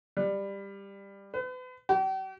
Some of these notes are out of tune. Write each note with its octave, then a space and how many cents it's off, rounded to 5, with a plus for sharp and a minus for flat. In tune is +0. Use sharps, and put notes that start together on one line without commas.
G3 +15
B4 +40
G4 -45